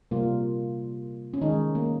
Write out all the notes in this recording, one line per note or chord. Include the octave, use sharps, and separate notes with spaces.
C3 G3 A#3 F4
C#4
D#3 G#3 D#4
A#3